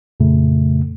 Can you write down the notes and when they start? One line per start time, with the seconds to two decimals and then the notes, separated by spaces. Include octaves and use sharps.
0.20 F2 A#2 C#3 A3